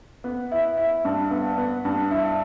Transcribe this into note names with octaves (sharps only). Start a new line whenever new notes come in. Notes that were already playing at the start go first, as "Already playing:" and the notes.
B3
E4
E4
G2
B3
B3
G2
E4